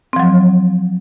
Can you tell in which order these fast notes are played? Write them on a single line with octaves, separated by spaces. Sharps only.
C4 F3 F#3